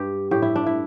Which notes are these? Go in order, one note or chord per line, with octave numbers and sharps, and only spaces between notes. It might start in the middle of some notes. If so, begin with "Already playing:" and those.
Already playing: G2 G4
A2 G4
E4
D4
E4